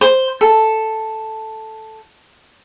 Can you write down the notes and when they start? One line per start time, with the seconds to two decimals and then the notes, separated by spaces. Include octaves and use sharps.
0.01 C5
0.41 A4